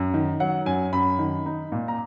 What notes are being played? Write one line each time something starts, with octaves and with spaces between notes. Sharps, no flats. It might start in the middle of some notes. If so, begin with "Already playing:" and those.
Already playing: F#2
D#3
F#3 F#5
F#2 G#5
F#2 B5
D#3
D#4
A#2
A#5